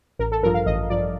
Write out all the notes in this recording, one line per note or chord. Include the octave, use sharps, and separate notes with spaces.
A1 A#4
A4
G2 F3 A#4
F5
A1 D#5
G2 F3 D5